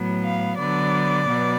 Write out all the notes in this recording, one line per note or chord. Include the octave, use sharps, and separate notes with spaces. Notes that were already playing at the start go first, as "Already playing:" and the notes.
Already playing: A2 F#3 B3
F5
D3 F#3 B3 D5
B2 F#3 B3